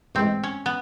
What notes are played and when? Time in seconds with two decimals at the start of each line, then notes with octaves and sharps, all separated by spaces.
0.15 A1 G#2 E3 G#3 C4
0.44 C#4
0.66 B3